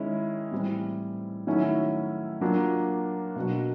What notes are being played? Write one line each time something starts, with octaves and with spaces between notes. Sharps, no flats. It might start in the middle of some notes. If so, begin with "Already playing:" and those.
Already playing: D#3 G#3 C#4 E4
A2 E3 G3 C4
D#3 F#3 A3 C#4 E4
F#3 A#3 D4 F4
B2 F#3 A#3 D4 F#4